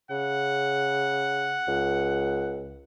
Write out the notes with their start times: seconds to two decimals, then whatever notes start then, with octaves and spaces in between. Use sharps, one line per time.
0.11 C#3 F#5
1.68 C#2